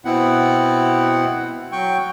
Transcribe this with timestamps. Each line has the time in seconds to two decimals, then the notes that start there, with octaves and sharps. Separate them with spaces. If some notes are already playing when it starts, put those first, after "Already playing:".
0.05 B2 B3 C4 E4 F#5
1.72 F#3 G5 C#6